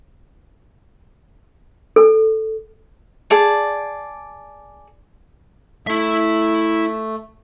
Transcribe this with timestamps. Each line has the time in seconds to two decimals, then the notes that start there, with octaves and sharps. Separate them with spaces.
1.96 A4
3.30 G#4 D5 A5
5.87 A3 E4 E5